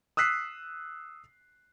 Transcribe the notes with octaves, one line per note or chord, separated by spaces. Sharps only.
D#6 E6 F#6 B6 C7